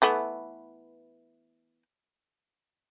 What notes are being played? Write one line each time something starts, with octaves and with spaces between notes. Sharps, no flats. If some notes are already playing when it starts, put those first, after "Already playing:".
E3 A3 B3